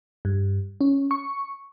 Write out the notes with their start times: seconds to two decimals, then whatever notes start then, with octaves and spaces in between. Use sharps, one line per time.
0.25 G2
0.81 C#4
1.11 C#6